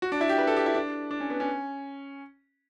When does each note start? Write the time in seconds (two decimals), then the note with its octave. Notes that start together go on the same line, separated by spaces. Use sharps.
0.02 F#4
0.12 D4
0.21 E4
0.29 G4
0.38 B4
0.47 A4
0.56 G4
0.66 E4
0.75 D4
1.11 D4
1.20 C#4
1.30 B3
1.40 C#4